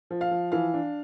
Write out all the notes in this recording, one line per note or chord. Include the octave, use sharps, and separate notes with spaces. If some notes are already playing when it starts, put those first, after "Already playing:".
F3
F5
F3
E3 F5
D4